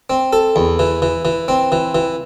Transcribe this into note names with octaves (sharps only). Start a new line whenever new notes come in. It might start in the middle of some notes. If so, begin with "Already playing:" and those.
C4
A4
E2
E3
E3
E3
C4
E3
E3